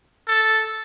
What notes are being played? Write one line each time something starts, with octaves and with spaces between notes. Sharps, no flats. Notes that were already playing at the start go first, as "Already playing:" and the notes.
A4